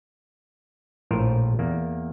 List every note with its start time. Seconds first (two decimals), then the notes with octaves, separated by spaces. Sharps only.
1.11 A#1 A2 F4 A#4 C5
1.59 E2 A#3